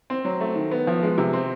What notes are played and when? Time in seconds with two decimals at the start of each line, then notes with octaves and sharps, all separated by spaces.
0.10 C4
0.25 F#3
0.41 A3
0.55 D#3
0.71 B3
0.87 F3
1.03 G#3
1.18 C3
1.33 C4